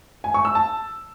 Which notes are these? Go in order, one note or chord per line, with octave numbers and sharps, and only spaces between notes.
G#5
C#6
E6
A5